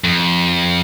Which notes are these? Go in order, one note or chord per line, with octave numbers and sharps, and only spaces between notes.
F2